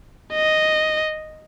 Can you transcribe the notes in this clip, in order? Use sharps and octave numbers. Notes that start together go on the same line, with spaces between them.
D#5